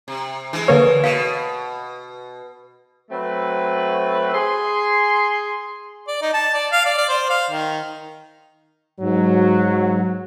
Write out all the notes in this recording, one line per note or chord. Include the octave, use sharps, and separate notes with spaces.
C3
E3 G#3
D3 A#3 B4 C#5
B2 F5
F#3 A3 C4 B4
G#4 C6
D5
D#4
A5
D5
F5
D5
D5
C5
F5
D#3
G#2 F#3